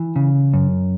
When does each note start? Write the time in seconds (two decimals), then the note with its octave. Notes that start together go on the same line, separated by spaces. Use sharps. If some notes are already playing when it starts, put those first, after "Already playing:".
Already playing: E3
0.16 C#3
0.53 F#2